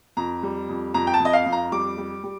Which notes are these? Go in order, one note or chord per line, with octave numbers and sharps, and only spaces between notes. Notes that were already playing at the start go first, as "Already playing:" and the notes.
F2 A#5
G3
F2
F2 A#5
G5
A5
F2
D#5
F5
F2
A#5
G3 D6
G3
G3